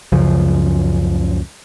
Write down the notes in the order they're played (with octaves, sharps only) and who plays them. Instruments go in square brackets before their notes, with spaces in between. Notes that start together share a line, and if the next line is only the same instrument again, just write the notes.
[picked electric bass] C#2 F#2 C#3 F3